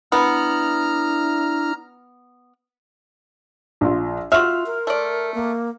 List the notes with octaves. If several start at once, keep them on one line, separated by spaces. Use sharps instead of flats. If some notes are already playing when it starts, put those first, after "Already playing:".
B3 D4 E4 A#5 F6
A#1 F4 C6
F4 F#4 E5 C6 F6
A#4
A3 D5
A#3